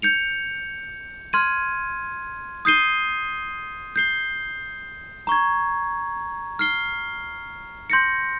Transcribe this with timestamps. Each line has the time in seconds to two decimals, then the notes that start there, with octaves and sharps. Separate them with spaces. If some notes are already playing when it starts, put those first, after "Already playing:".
0.02 G6 C#7 F7
1.33 C6 F6 G#6 D#7
2.65 D#6 G6 C7 D#7 G7
3.96 G6 C7 G7
5.27 A#5 C#6 G#6
6.59 F6 C7 G7
7.90 C6 G6 A#6 C#7